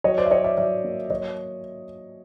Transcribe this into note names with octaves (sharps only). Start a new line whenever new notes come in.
F#3 C#5 D#5
C5 D5
E5
F#3 C#5 D#5
D5 E5
F#3 D5 E5
A#3
F#3 C#5 D#5